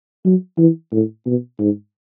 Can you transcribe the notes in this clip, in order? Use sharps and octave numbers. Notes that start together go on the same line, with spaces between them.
F#3
E3
A2
B2
G#2